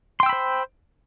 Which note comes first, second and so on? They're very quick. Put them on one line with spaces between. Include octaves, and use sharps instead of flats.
C6 G5 E6 B5 C5